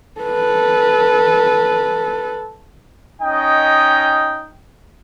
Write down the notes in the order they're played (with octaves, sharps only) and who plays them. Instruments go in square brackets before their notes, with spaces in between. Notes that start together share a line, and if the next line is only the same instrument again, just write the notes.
[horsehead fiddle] A4 B4
[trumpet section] C#4 D#4 D#5 G5